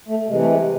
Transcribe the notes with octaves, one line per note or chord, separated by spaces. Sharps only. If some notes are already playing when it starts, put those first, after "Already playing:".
A3
C3 E3 G#3
A3
G#3